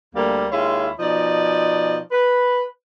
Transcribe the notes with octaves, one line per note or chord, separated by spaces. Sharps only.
D2 G3 A#3
D#2 G#3 E4 F4 C#5 F5
B2 F3 D#4 D5 D#5
B4